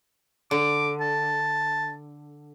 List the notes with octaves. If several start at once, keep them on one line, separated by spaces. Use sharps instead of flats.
D3 D6
A5